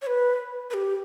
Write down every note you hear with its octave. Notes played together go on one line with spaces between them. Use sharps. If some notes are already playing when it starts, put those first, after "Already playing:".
C#5
B4
B4
G4